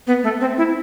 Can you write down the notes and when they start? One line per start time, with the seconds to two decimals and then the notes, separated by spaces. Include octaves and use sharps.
0.07 B3
0.23 A3
0.41 C4
0.58 E4